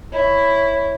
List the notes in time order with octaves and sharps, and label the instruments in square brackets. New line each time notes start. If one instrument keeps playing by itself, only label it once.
[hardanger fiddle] E4 [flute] C#5